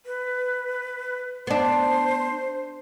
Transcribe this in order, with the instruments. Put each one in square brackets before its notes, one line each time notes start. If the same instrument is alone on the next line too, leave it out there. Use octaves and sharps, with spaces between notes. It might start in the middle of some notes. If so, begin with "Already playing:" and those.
[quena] B4
[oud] B3 D4 [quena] C5